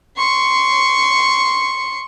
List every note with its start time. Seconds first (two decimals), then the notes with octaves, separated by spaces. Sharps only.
0.17 C6 C#6